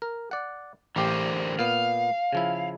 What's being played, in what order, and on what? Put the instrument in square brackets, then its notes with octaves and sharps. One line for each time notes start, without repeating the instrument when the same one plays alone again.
[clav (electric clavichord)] A#4
D5 F#5
[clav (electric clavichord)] A1 G4 G5 [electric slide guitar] D3 A#4 C5
[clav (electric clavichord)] A#2 B3 [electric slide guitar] F5
[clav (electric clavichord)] C#3 F3 E4